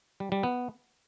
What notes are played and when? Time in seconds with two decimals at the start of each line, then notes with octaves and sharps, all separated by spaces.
0.20 G3
0.32 G3
0.43 B3